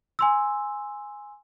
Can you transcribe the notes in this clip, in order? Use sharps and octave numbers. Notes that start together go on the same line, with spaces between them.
G#5 C6 E6